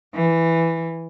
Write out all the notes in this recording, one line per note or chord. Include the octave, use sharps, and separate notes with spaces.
E3